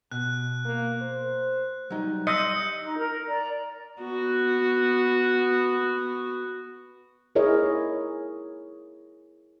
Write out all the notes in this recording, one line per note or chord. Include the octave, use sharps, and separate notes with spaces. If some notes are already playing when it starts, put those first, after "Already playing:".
B2 F#6
A#3
C5
F#3 G3 D#4
D#5 C6 E6 G6 C#7
D#4
A#4
D5 A#5
B3 F#4
E4 G#4 A#4 C#5 D#5